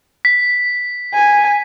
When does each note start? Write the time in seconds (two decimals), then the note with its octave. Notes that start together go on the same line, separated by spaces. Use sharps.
0.25 B6
1.14 G#5